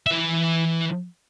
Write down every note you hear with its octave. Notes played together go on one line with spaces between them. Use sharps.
E3 E5